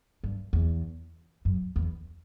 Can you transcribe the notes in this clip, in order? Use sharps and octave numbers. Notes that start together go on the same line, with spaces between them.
G2
E2
F#2
E2